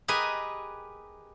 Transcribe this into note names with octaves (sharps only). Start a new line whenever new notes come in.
G4 G#4 A#4 B4 D#5 G#5